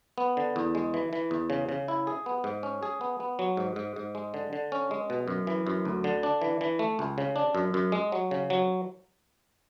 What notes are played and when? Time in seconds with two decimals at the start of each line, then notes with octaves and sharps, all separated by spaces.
0.18 B3
0.37 D3
0.56 E2
0.75 G#3
0.94 E3
1.13 E3
1.31 E2
1.50 C#3
1.69 C#3
1.88 E4
2.07 G#4
2.26 B3
2.44 G#2
2.63 C#4
2.83 G#4
3.01 B3
3.20 B3
3.39 F#3
3.57 G#2
3.76 G#2
3.96 G#2
4.15 G#3
4.34 D3
4.53 D3
4.72 C#4
4.91 G#3
5.10 B2
5.28 F#2
5.47 E3
5.67 F#2
5.85 D2
6.04 D3
6.23 D4
6.42 E3
6.61 E3
6.79 A3
6.99 C#2
7.18 C#3
7.36 D4
7.55 F#2
7.74 F#2
7.92 G#3
8.12 F#3
8.31 C#3
8.50 F#3